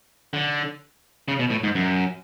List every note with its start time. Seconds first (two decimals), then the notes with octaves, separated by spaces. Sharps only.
0.33 D3
1.28 C#3
1.39 B2
1.50 A2
1.63 G#2
1.75 F#2